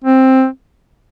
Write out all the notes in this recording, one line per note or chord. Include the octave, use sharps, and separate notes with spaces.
C4